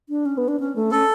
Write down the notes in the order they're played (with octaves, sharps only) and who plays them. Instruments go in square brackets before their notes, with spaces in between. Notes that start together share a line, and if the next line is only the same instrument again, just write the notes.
[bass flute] D4
C#4
B3
D4
C#4
A3
[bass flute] C#4 [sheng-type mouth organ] A4